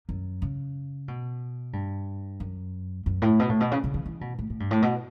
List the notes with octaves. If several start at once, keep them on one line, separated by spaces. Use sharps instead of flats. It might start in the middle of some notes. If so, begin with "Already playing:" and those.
F#2
C#3
B2
G2
F#2
F#2
A2
B2
A2
B2
C#3
C#3
E3
E3
B2
A2
A2
G2
A2
B2